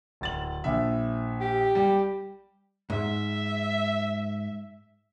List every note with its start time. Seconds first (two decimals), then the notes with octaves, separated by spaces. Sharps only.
0.21 D1 A6 F#7
0.64 A#1 E5
1.40 G4
1.75 G3
2.90 G#2 E5